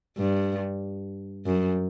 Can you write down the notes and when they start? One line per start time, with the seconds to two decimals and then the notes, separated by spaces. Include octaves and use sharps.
0.18 G2
1.46 F#2